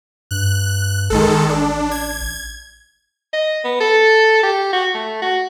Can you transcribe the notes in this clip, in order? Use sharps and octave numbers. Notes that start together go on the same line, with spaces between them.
G2 F#6
A1 D#3 G#3 A4
D4
G#6
D#5
B3
A4
G4
F#4
A3
F#4